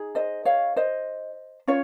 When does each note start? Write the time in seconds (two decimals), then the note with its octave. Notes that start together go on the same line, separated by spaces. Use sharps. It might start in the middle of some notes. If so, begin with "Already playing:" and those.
Already playing: D#4 G#4
0.15 C5 D#5
0.45 C#5 F5
0.76 C5 D#5
1.68 C#4 F4 C#5